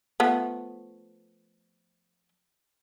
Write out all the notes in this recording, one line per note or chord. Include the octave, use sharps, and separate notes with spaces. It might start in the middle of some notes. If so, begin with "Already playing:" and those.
F3 A3 B3